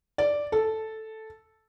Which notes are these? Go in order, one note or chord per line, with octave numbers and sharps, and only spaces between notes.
D5
A4